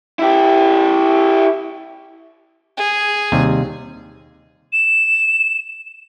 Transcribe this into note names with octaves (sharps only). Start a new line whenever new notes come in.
E4 G4
G#4
D#2 C3 G3
E7